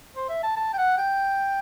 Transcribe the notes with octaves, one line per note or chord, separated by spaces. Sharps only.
C5
E5
A5
A5
G5
F#5
G5